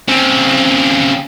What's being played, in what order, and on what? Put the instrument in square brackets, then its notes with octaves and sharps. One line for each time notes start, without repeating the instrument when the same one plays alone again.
[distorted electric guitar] C#3 C4